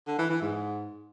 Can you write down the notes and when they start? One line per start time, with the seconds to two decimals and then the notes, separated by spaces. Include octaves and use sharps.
0.07 D3
0.19 E3
0.30 E3
0.41 G#2